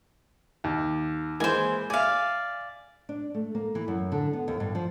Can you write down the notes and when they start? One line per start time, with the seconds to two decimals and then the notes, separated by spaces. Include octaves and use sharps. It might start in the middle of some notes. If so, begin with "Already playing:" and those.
0.64 D#2
1.40 E3 G#3 A#3 C5 G#5
1.90 D5 E5 F5 G#5
3.09 D4
3.35 A3
3.55 A#3
3.75 E3
3.88 F#2
4.12 D3
4.33 B3
4.48 D#2
4.60 G2
4.75 F3